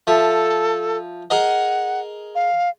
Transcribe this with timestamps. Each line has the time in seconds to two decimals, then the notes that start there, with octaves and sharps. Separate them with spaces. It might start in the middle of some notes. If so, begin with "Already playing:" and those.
0.07 F3 A4 E5
1.30 G#4 A#4 D#5 F#5
2.35 F5